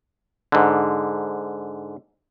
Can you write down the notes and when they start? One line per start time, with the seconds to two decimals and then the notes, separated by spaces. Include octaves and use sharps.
0.52 G#2 D3